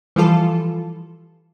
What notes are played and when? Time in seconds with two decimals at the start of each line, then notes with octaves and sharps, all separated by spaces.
0.16 E3 F3 G3 F4 A4